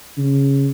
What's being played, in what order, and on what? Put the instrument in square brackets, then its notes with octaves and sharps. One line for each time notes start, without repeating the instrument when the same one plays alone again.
[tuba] C#3